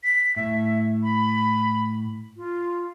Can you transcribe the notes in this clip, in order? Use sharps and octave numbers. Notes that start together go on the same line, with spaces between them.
B6
A2 E5
B5
F4